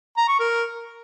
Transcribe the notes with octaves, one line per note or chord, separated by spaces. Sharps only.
A#5
C#6
A#4